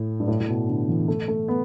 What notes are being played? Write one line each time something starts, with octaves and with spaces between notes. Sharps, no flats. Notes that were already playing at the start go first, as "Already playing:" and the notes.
Already playing: A2
G2
A2
A2
B2
D3
E3
A3
A3
B3